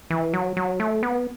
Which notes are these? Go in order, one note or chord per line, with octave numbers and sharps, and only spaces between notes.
E3
F#3
F#3
A3
B3